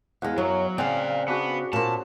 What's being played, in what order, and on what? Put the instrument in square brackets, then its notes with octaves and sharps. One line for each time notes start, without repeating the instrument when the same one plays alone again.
[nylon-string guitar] E2 G#3 [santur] D#5 F5 F#5
[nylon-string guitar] F#2 C#5 [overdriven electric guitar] F#3
[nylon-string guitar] C#3 C4 [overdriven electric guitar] D5 F5 [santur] F#5 G#5 D#6
[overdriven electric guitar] B3 [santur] D4 F#4 G#4
[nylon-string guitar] A#2 A#3 [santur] C#4 C5 [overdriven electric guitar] A5